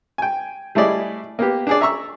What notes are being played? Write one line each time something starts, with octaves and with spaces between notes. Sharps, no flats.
G5 G#5
G3 A3 E4 G#4 D5 D#5
A#3 B3 G4
D4 G#4 D5
E5 A#5 C#6 E6